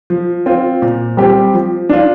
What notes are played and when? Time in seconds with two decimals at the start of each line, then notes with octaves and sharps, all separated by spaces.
0.10 F3
0.46 C4 F4
0.82 A#2
1.17 G3 C4 G4
1.54 F3
1.89 D4 F4